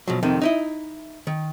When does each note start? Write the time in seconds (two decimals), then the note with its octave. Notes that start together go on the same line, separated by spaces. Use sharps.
0.07 B2 F3 F#3
0.23 F2 C3 D#3
0.42 D#4 E4 D#5
1.27 D#3